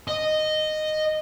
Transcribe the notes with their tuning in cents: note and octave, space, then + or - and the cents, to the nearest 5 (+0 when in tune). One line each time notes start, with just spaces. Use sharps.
D#5 -10